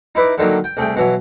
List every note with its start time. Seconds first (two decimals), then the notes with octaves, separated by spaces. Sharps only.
0.15 D#4 E4 B4 D5
0.38 D3 D#3 F#3 A#3
0.64 G5
0.77 C2 A3 G#4 G5
0.96 B2 E3 F#3